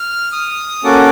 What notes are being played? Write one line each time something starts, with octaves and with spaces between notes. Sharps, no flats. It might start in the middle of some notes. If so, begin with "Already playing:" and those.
Already playing: F6
D#6
A#3 C#4 F#4 A4 D6